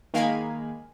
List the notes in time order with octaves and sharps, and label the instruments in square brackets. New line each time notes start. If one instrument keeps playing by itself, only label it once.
[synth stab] D#3 G#3 A#3 F5 G#5 B5